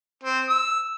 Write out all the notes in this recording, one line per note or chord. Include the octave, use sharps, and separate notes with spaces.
C4
E6